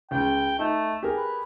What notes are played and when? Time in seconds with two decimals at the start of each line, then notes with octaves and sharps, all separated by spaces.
0.11 C#2 C#3 G5
0.59 A3 D#4
1.03 G4 G#4 A#4
1.17 B4